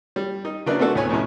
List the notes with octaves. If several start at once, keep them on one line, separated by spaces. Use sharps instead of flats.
G3
D#4
C#3 F#3 A#3 D4 E4 B4
A3 B3 C4 D4 F#4 A4
D2 A2 B3 B4 C#5 G#5
F2 A2 C3 C#4